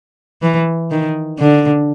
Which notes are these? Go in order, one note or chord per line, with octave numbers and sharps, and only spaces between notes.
E3
D#3
D3